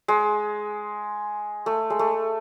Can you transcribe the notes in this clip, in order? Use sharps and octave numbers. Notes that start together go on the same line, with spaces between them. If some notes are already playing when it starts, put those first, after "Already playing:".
G#3
A3
G#3
A3